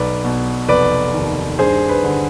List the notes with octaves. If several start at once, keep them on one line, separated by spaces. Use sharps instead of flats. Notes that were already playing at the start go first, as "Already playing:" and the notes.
Already playing: B1 B4 D5
B2
F1 B4 D5
D#2
G2 G#4 C5
B4
D3